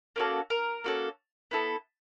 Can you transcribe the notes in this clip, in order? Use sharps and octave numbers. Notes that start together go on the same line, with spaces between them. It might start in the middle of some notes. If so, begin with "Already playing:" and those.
A#3 C#4 F#4 A4
A#4
A#3 C#4 F#4 A4
B3 E4 A4